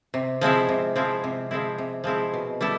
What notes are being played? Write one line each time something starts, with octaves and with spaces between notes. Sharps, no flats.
C3
F3 G#3 C4 E4
C3
F3 G#3 C4 E4
C3
F3 G#3 C4 E4
C3
F3 G#3 C4 E4
B2
G3 B3 E4 A4